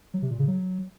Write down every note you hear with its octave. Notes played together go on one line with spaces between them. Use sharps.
F#3
C3
A#2
C#3
F#3